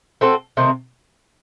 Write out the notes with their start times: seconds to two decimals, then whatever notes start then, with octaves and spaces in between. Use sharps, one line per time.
0.21 A3 C4 F#4 A4
0.57 C3 D#3 A3 C4